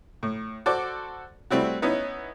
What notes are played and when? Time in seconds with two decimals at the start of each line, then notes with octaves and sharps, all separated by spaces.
0.23 A2
0.66 F#4 A4 C5 D5 D6
1.51 G3 A3 C4 E4 F#4
1.82 B3 C#4 D#4 E4